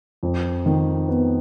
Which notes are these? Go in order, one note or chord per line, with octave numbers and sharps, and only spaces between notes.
F2
D#3
B3